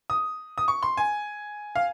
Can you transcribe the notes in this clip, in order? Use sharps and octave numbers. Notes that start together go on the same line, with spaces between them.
D#6
D#6
C#6
C6
G#5
F5